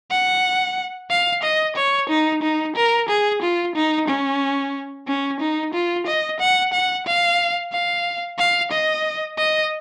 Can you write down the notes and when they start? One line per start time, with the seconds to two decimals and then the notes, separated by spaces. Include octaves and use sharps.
0.11 F#5
1.10 F5
1.43 D#5
1.76 C#5
2.09 D#4
2.43 D#4
2.76 A#4
3.09 G#4
3.42 F4
3.75 D#4
4.08 C#4
5.08 C#4
5.40 D#4
5.74 F4
6.07 D#5
6.40 F#5
6.73 F#5
7.06 F5
7.72 F5
8.38 F5
8.71 D#5
9.38 D#5